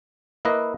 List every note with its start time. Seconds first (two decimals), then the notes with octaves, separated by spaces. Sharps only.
0.45 A#3 E4 B4 D#5